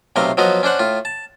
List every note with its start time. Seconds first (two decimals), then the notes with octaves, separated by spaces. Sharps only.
0.16 B1 C3 A3 F5 A#5 C6
0.37 F3 F#3 B3 F#4 D#5
0.63 C#4 D4 C5 F#5
0.79 A2 F4
1.05 A5